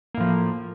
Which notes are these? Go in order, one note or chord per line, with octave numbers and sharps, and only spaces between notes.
A2 F3 A#3